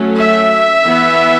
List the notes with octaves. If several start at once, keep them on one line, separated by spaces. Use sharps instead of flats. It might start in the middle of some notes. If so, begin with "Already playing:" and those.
Already playing: F#3 A3 C#4
E5
E3 B3